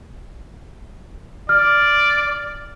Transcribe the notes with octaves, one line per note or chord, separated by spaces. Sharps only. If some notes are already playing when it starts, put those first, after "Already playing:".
D5 F6